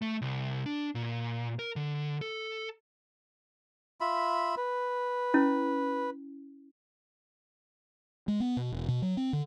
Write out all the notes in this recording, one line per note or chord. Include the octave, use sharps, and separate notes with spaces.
A3
C2
D4
A#2
A#4
D3
A4
F4 E5 B5
B4
C#4 E4
G#3
B3
B2
E1
B2
F#3
C4
D3